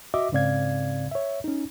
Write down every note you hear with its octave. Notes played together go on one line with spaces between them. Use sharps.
F#4 D#5 E5 D6
G#2 C#3 C4 D5 F5 G#6
C#5 E5
C#4 D#4